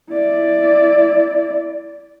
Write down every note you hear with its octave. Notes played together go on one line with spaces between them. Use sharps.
E4 D5